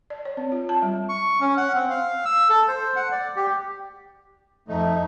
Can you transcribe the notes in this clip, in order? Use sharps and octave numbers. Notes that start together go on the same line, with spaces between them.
D5
C#5
C4
F4
A5
G3
C#6
C#4
F#5
C4
F5
E6
A4
C5
F#5
D5
G4
F2 A3 D#4